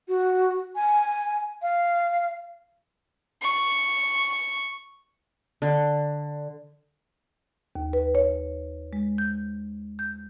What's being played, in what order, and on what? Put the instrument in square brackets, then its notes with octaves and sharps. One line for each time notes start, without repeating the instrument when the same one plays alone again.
[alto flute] F#4
G#5
F5
[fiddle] C#6
[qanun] D3
[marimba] D#2
B4
C#5
G#3
G6
G6